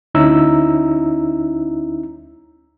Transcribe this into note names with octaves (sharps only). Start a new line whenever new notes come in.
D2 C#4 D#4 E4 A#5 E6